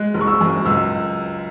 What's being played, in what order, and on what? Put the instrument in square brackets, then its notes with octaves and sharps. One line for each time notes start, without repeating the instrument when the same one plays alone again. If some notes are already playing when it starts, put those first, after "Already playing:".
Already playing: [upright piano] G#3 F#6
F#1
C#6
E6
F#2
C#2 E6